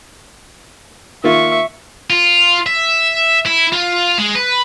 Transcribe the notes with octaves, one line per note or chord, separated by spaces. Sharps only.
D#3 A#3 F4 E5 C#6
F4
E5
E4
F4
G#3
B4